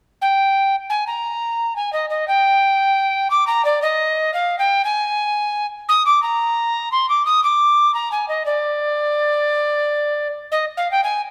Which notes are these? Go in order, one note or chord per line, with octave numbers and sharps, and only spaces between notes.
G5
G#5
A#5
G#5
D#5
D#5
G5
D6
A#5
D5
D#5
F5
G5
G#5
D#6
D6
A#5
C6
D6
D#6
D6
A#5
G#5
D#5
D5
D#5
F5
G5
G#5